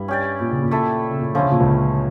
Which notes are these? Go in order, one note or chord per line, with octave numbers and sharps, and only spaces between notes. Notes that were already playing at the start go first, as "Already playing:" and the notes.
Already playing: G2 G3 E4
C#4 G4 D5
A#2
C#3
A#2
A3 E4 A4 E5
C#3
A#2
D3 F3 C#4 E4
C#3
A#2
C#2 C#3